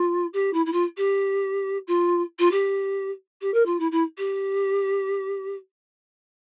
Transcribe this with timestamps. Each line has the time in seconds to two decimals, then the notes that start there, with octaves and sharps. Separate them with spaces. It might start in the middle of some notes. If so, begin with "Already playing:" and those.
Already playing: F4
0.33 G4
0.53 E4
0.66 E4
0.72 F4
0.97 G4
1.87 F4
2.39 F4
2.51 G4
3.41 G4
3.54 A#4
3.66 F4
3.79 E4
3.91 E4
4.17 G4